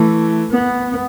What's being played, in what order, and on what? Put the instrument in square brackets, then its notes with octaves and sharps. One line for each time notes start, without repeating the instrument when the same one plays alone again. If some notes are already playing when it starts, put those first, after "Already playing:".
Already playing: [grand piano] E3 [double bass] A3
[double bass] B3